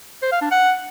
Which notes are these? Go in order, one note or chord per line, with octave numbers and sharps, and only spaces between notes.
C5
F5
D4
F#5